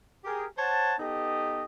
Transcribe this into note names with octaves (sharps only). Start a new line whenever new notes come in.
G4 G#4 A#4
C5 C#5 F#5 A5
B3 D#4 G4 A4 D#5